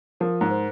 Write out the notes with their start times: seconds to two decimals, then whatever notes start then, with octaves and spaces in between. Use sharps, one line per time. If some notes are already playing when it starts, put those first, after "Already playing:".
0.20 F3 A#4
0.41 G#2
0.51 C5